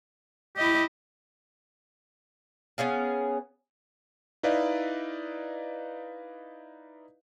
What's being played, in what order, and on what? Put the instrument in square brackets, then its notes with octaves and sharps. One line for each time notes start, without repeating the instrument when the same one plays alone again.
[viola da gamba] E4 D#5 [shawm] G4
[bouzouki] B3 C#4 G#4 F5
[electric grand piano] D#4 E4 B4 D5 D#5 F5